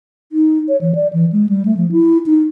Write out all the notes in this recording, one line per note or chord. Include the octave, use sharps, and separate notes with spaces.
D#4
C#5
E3
D5
E3
G#3
G3
A3
F3
E4
D#4